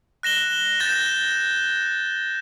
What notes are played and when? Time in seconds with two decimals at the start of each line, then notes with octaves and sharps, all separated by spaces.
0.23 F#6 A#6 E7 G7
0.80 G6 A6 A#6 E7